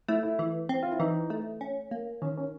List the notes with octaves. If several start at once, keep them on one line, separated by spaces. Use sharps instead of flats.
A3 E4
E4
E3
C4
F4
E4
E3 D#4
A3
C#4
A#3
D#3 C#4
C#4